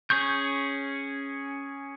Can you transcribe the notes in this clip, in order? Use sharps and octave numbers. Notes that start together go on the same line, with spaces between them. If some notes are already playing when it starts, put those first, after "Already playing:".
C#4 G#4 C#6 G6